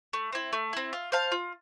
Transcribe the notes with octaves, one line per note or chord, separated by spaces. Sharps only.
A3
C4 E4
A3
C4 E4
F4
C5 F5 A5
F4